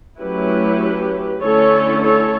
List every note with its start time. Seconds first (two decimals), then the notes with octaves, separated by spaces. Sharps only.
0.20 F#3 A3 C#4 E4 G4 B4
1.41 D3 A3 C#4 E4 A4 C#5
2.03 A4 C#5